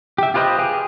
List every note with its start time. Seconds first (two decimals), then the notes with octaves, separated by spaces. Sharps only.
0.18 G4 E5
0.34 F4 G4 B4 C5 D#5
0.59 G4 G#4